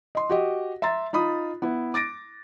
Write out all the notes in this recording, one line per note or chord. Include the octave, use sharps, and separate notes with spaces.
D#5 C6
F#4 G4 D#5
E5 A#5 C6 A6
D#4 F4 B5 D#6
B3 E4
D6 A6 A#6 D7